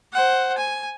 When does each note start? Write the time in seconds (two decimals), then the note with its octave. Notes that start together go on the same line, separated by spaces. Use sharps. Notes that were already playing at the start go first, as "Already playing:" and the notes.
0.13 C5 F#5
0.58 G#5